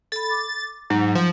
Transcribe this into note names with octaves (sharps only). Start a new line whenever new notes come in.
A4 B5 A6
D6
G#2 F#3
F3